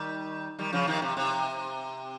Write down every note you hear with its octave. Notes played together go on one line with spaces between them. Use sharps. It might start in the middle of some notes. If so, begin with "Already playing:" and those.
Already playing: D#3 G3
D#3 G3
C#3 F3
C3 D#3
C3
C3